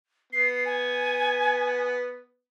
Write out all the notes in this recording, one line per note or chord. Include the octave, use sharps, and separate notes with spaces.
B3 C7
G#5